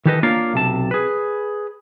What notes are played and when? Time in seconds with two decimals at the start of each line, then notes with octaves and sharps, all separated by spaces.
0.05 D#3 E3 G4 A4 B4 D#5
0.23 A#3 D4 F4 A#4 C#5 F5
0.54 B1 C3 A5
0.91 G#4 B4